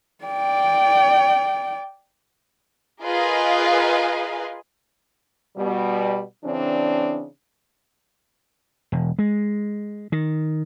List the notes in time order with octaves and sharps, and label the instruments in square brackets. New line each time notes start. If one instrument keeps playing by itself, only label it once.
[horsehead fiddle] D5 G5
[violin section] F4 G#4 A#4 B4 D#5 F5
[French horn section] B2 G3
C#3 E3 C4 D4
[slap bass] E1
G#3
D#3